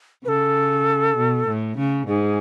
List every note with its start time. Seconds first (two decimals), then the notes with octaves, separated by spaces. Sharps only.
0.24 C#3 B4
0.28 A4
1.17 B2
1.47 A2
1.77 C#3
2.07 G#2 G#4